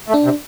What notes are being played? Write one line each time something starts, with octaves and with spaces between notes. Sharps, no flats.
A3
D4
C3